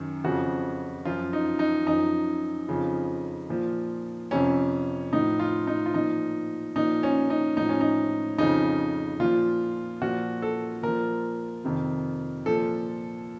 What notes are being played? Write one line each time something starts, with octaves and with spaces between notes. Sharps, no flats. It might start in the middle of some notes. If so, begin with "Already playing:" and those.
Already playing: F#2 D#3
F2 C#3 F3 F#4
F#2 F3 F4
D#4
D#4
F#2 F3 D#4
F2 C#3 F3
A#2 F3
F2 C3 F3 C#4
A2 F3 D#4
F4
D#4
F4
A#2 F3 D#4
A#2 F3 D#4
C#4
D#4
A2 F3 D#4
C#4
D#4
F2 C#3 F3 D#4
A#2 F3 F4
A#2 F3 F#4
A4
A#2 F3 A#4
F2 C3 D#3
A#2 F3 A4